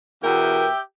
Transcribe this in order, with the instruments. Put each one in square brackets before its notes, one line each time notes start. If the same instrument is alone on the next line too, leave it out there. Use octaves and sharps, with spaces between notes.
[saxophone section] E2 B2 A#4 [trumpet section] G4 E5 G5